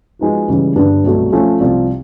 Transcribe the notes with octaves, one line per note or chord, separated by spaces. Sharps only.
F3 G#3 B3 D#4 F#4
C#2 C#3 E3 G3
G2 D3 G3 B3 D4
C2 B2 F#3 A3
F3 A3 C#4
C2 C3 F3